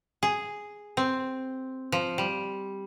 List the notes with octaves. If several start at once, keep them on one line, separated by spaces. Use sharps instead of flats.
G#4
C4
F3
G3